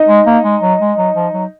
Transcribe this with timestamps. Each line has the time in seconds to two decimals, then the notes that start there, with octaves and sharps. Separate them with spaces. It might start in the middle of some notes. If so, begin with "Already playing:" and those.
Already playing: D#4 D#5
0.09 G#3
0.26 A#3
0.44 G#3
0.63 F#3
0.81 G#3
0.98 F#3
1.15 F3
1.33 F#3